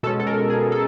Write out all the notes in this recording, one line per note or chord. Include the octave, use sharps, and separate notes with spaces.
B2 G#3 C#4 A4
A4
A#4
G#4
A4